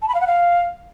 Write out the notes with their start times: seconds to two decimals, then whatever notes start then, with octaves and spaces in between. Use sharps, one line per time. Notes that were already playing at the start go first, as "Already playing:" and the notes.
0.02 A5
0.08 B5
0.14 F5
0.21 F#5
0.27 F5